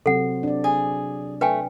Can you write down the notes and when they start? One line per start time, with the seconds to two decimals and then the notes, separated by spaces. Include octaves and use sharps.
0.06 C3 F#3 C4 A4 F#5
0.43 D4 D5
0.64 G#4
1.41 A3 B4 G5 G#5